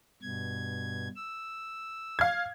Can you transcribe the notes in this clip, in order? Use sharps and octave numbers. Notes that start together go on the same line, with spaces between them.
G2 B2 G#6
E6
F5 G#6